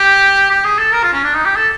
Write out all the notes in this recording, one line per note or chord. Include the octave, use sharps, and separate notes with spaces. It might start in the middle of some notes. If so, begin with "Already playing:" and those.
Already playing: G4
G4
G#4
A4
A#4
F4
C#4
D4
D#4
G4
A4